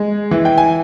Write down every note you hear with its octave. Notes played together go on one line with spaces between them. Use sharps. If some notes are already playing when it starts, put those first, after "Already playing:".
Already playing: G#3
E3
G5
G#5